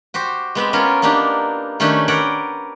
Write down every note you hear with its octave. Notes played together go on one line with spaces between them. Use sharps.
F#4 G4 C5
G#3 B3 C4 G4
B3 C#4 F4 A#4 C#5
A#3 B3 D4 D#4 G4
D#3 A3 C#4 D4 G4 A4
A#4 B4 C#5 D5 F#5 G5